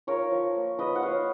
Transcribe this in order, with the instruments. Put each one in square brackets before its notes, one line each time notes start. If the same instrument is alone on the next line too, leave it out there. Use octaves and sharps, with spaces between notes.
[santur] F4 A#4 C#5
F3
A#3
F3 B4 D#5
F#5
F4 C#5 F5